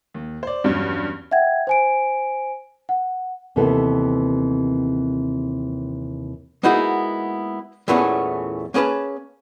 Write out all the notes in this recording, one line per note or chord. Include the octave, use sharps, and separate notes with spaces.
D#2
C5 D5
E2 G2 F#3 C#4
E5 F#5 G5 G#6
C5 G#5 D7
F#5
D#2 C3 E3 B3 A4
G#3 A#3 B3 D#4 E4 F#4
E2 A#2 E3 A3 B3 C#4
A#3 C#4 G#4 B4 A5